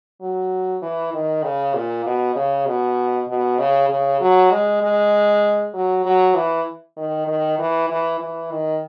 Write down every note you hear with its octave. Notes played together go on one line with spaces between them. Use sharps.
F#3
E3
D#3
C#3
A#2
B2
C#3
B2
B2
C#3
C#3
F#3
G#3
G#3
F#3
F#3
E3
D#3
D#3
E3
E3
E3
D#3